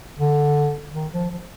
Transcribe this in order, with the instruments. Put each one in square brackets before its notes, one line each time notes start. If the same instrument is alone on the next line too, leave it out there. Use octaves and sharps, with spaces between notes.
[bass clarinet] D3
D#3
F3
F3